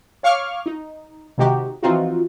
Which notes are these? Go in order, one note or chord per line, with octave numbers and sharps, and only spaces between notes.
C#5 F5 C#6 D6 F6
D#4
C3 D#3 G#3 D#4 F#4 G4
E3 F3 C4 D#4 F4 F#4